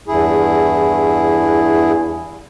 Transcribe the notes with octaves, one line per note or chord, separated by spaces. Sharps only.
E2 G2 E4 G#4